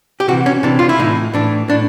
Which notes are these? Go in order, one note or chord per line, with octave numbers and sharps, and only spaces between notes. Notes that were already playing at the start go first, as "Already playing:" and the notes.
G4
C3 E3 F#4
C#4
C3 E3 D4
F4
E4
A2 E3 D#4
A2 E3 D4
A2 D4